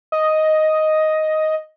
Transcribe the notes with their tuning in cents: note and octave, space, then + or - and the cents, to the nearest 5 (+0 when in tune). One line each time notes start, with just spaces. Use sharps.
D#5 +5